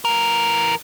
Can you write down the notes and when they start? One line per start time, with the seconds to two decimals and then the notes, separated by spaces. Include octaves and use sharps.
0.05 E3 A#4